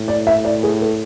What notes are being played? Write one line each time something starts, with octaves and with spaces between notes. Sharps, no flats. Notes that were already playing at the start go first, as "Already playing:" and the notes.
Already playing: A2
D5
E5
D5
G#4
A4